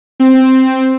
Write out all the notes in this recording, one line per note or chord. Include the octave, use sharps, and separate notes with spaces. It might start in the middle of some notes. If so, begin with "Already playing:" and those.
C4